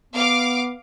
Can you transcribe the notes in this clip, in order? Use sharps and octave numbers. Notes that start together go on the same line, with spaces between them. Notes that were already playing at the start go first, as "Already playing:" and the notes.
B3 F5 D6